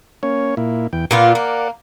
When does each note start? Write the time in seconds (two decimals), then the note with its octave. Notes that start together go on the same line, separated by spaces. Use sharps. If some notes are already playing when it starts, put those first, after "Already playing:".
0.23 A#3 C#4 C#5
0.57 A#2 A#3 E4
0.93 E2 E3 G5
1.11 A#2 B3 F4 A#4 D5 F#5
1.35 A#3